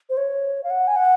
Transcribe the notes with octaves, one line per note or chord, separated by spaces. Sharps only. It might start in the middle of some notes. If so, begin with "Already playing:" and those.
C5
C#5
F5
F#5
G#5
F#5